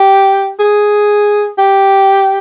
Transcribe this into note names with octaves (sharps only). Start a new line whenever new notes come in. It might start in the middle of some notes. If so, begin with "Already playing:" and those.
Already playing: G4
G#4
G4